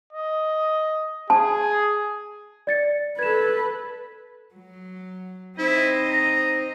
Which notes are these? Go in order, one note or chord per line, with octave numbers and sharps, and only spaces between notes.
D#5
G#4 A5
D5 A6 C#7
A4 B4 G#6 E7
F#3
C4 D#4 E4 C5 D#5
A#5